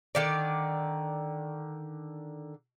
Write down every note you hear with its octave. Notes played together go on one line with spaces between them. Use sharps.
D3 D#3 D5